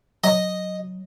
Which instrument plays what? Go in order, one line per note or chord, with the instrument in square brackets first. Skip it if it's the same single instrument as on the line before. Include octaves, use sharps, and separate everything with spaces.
[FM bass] F#3 [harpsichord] D#5